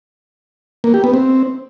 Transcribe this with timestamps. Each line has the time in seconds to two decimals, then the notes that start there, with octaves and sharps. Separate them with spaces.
0.84 A#3
0.94 G4
1.04 B3
1.14 C4